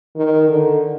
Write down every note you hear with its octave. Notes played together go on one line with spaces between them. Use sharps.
D#3
D3